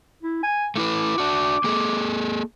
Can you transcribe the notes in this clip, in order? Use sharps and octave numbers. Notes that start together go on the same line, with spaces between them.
E4
G#5
A3 E4 B4 D6
D4 F#4
A#3 G#4 A4